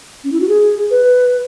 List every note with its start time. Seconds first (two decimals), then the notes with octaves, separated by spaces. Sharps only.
0.24 C#4
0.32 E4
0.41 F#4
0.49 G#4
0.91 B4